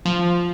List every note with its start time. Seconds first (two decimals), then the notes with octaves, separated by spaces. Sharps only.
0.05 F3